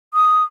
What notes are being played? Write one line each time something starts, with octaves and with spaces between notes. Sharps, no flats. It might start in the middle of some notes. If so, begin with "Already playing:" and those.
D#6